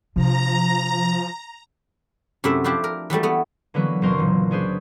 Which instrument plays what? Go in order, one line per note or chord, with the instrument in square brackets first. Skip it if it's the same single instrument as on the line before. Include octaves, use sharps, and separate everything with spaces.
[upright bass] C3 D4 [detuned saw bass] F3 [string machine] A#5
[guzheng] F#2 C3 A3 E4 E5
F3 D4 E4 G4 C5
A#4
E3 F#3 G3 A3
A3 B3
[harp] D3 E3 F#3 A#3 B3 B4
F#1 B2 F#3 C4 A#4 C6
A#2 E3
C#4 D4 G#4 B4 C5